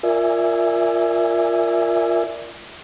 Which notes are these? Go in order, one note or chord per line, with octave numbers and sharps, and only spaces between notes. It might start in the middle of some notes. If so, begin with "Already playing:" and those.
F4 A#4 D5 E5 G#5